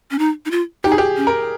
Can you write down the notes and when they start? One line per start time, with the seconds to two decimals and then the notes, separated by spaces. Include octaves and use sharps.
0.11 C#4
0.19 D#4
0.46 D#4
0.51 F4
0.84 D#4 G4
0.92 G#4
0.98 G4
1.17 C#4
1.27 A#4